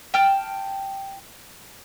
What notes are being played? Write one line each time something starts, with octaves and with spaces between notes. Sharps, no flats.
G5 A5 F6